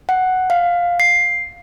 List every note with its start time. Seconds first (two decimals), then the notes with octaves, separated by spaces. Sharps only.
0.09 F#5
0.50 F5
1.00 C7